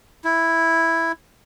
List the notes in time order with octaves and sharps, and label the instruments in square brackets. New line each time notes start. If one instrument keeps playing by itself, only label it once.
[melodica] E4